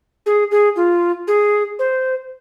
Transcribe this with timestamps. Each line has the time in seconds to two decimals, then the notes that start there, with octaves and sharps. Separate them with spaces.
0.26 G#4
0.51 G#4
0.76 F4
1.28 G#4
1.79 C5